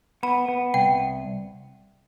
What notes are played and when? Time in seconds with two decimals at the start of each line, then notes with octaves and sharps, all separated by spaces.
0.23 B3 B5
0.48 B3
0.74 C2 G5